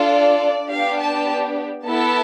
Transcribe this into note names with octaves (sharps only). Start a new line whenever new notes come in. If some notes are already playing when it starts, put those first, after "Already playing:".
Already playing: D4 F4 A4
D5
B3 D4 G4 F5
A5
B3 E4 A4 A5